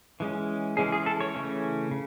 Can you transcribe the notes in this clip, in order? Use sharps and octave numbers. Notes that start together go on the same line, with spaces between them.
E3 G#3 C#4
E3 G#3 C#4 G#4
G#4
A4
C#5
C#3 E3 A3 C#4
C#3